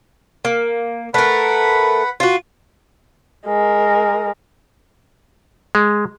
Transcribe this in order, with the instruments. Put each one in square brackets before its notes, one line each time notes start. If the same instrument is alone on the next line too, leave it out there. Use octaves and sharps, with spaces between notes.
[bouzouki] A#3
[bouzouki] A3 A#4 [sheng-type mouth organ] B4 F#5 B5
[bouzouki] F4 F#4
[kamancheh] G#3 A#4
[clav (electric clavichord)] G#3